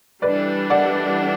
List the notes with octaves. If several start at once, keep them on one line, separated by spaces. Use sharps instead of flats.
E3 G3 D4 A4 B4 D5
D5 F#5